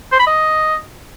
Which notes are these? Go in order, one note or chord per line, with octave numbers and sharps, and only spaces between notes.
C5
B5
D#5